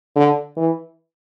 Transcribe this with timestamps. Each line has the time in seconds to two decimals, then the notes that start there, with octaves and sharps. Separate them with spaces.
0.16 D3
0.57 E3